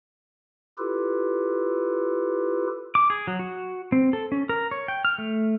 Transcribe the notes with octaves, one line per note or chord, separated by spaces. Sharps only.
E4 F4 G4 A4 B4
D6
G#4
F#3
F#4
C4
A4
C#4
A#4
C#5
G5
F6
A3